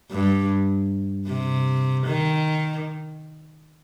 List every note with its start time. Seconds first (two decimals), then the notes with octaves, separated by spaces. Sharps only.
0.11 G2
1.27 C3
2.06 D#3